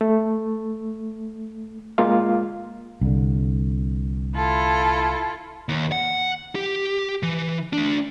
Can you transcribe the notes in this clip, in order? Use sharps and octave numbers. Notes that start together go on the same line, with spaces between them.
A3
G#3 A#3 F4 F5
C2 D3
E4 F4 A4
D#2
F#5
G4
E3
A3 D4